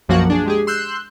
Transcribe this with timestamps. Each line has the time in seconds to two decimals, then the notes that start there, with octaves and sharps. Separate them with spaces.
0.09 B1 F#2 F3 A#3 F#4 F#5
0.30 D4 G#4
0.45 G#3 G4 G#4
0.67 C6 E6 F#6 G6